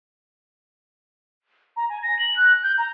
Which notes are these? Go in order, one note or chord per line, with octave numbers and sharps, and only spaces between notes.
A#5
G#5
A#6
F#7
F#6
G6
A#5